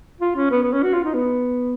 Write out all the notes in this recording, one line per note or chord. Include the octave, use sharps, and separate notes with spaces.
F4
C#4
B3
B3
C#4
F#4
F4
D#4
B3